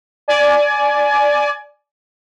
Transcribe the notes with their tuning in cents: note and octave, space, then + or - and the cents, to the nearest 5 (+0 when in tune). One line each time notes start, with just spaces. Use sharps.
D5 +0 G#5 +25